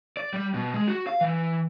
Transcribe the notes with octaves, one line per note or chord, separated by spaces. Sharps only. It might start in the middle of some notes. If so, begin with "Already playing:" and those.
D5
G3
B2
G#3
F#4
F5
E3